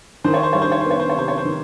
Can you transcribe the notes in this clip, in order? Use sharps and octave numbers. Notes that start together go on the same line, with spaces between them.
D#3 C5
C#5
C5
G3 C#5
C5
C#5
B3 C5
C#5
C5
C#5
C3 C5
C#5
C5
D#3